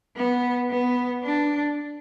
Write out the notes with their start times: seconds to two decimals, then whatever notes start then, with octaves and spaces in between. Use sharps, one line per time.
0.16 B3
0.70 B3
1.23 D4